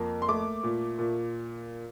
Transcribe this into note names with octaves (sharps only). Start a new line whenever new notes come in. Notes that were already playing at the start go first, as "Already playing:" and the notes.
Already playing: F2 A#3
C6
A3 D6
A#2
A#2